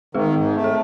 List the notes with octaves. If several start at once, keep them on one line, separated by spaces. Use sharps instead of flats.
D#3 G#3 G#4
G#2
A3
A4